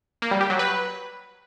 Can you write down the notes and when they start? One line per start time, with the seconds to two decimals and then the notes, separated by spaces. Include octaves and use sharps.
0.22 A#3
0.31 G3
0.41 G4
0.50 F#3
0.59 B4